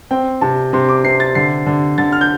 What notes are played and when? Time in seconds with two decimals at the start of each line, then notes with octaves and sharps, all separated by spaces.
0.11 C4 G5
0.41 C3 A5
0.73 C3 C6
0.89 D6
1.04 C3 C7
1.20 A6
1.35 D3 C7
1.66 D3
1.98 D3 A6
2.13 F6
2.21 G6